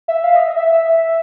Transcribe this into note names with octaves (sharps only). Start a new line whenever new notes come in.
E5
F5
D#5
E5
E5